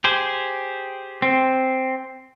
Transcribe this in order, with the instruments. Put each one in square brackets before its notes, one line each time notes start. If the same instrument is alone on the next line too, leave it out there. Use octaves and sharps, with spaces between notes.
[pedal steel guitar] G4 G#4 C5
[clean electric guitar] C4